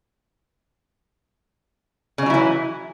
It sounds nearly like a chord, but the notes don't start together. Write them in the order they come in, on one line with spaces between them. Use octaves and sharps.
C#3 G#3 F#3 E4 E3